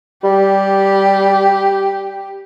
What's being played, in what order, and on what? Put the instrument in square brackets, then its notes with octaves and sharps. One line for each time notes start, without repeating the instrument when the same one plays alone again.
[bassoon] G3 [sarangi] G4